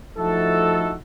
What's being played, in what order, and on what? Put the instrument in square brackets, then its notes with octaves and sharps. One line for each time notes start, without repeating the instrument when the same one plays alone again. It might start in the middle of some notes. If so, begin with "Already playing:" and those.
[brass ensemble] F3 A3 D#4 E4 F#4 A4